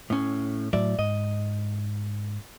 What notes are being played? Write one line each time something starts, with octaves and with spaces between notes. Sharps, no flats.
A2 C#4
A2 F#3 D5 E5
G#2 D#5